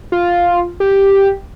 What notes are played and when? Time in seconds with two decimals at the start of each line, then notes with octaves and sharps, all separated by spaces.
0.12 F4
0.80 G4